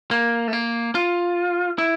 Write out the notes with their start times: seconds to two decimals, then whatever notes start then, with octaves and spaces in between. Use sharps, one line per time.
0.11 A#3
0.48 A3
0.53 A#3
0.95 F4
1.78 E4